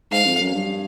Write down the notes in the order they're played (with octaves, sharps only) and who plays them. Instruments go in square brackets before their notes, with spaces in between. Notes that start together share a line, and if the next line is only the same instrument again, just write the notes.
[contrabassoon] G#2 [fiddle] F5
[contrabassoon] F2
F#2
G2